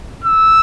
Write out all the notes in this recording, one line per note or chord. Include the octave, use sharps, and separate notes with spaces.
E6